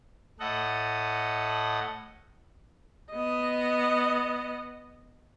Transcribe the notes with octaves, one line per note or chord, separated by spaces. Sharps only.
A2 A4 D#5 F#5
B3 D#5